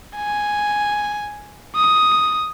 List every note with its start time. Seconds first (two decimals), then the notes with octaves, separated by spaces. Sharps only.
0.16 G#5
1.76 D#6